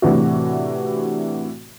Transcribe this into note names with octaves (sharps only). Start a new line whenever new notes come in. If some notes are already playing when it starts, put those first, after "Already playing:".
A2 C3 E3 D4 F#4